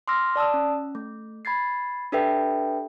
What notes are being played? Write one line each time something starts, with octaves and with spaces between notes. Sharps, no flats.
C6 D6 E6 F6 A#6
D5 A5 D#6 E6
C#4
A3
B5 G#6 A6 C7
D4 G4 A4 B4 E5 G5